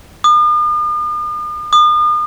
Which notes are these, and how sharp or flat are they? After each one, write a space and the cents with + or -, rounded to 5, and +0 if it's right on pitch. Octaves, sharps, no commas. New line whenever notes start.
D#6 -45
D#6 -40